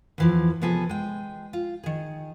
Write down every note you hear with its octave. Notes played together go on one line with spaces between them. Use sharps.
E2 E3 F3
C3 F3 B3 G#4 A4
G#3 G5
F4
D#3 G#4